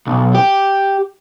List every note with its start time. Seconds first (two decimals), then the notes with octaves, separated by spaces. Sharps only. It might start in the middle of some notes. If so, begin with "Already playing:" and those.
0.07 B1
0.35 G4